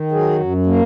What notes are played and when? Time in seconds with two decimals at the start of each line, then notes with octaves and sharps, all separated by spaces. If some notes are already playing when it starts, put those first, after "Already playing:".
Already playing: D#3
0.12 F#3 G#4
0.39 F#2
0.66 A#3